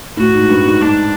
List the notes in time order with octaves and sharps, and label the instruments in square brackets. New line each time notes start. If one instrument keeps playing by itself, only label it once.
[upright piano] A2 [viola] F#4
[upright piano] G#2
G2
G#2
[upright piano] G#2 [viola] D4